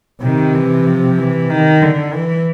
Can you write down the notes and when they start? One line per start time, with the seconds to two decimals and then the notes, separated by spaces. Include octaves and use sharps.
0.22 C3 D#3
0.54 E3
0.87 F3
1.18 E3
1.50 D#3
1.82 D3
2.14 E3